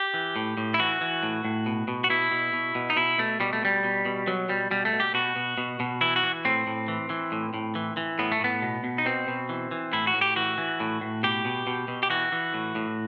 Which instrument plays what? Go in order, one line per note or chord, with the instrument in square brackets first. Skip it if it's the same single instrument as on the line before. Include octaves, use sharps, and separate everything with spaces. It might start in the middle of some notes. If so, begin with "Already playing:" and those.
Already playing: [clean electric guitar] G4
E3
A2
A2
E4
E3 F#4
E3
A2
A2
B2
B2
F#4
B2 E4
B2
B2
B2
D#4
B2 E4
B2 A3
B2 G3
A3
B2 G3
B2
B2
B2 F#3
B2 G3
B2 G3
A3
B2
G4
B2 F#4
B2
B2
B2
E3 E4
F#4
E3
A2 C4
A2
E3
E3
A2
A2
E3
E3
A2 B3
A3
A2 B3
B2
B2
D#4
B2 C4
B2
E3
E3
A2 E4
F#4
A2
G4
E3 F#4
E3
A2
A2
B2 G4
B2
B2
B2
G4
E3 F#4
E3
A2
A2